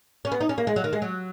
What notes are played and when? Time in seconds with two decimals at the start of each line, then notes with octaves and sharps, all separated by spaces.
0.25 C#4
0.32 B3
0.41 D#4
0.49 C#4
0.58 A#3
0.67 G#3
0.76 F#3
0.84 D#3
0.93 G#3
1.02 F#3